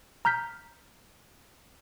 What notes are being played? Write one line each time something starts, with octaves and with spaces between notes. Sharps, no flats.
A#5 F6 G6 B6